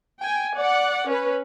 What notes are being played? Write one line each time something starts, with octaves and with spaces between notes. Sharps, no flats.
G5 G#5
D5 F#5
C#4 B4